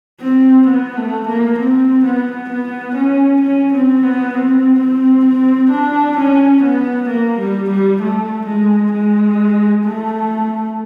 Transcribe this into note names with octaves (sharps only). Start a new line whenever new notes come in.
C4
B3
A3
A#3
C4
B3
B3
C#4
C#4
C4
B3
C4
C4
C4
D4
C#4
B3
A#3
G3
G3
A3
G#3
G#3
A3